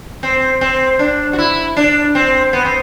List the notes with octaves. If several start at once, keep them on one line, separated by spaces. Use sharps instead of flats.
C4
C4
D4
F#4
E4
D4
C4
B3
C4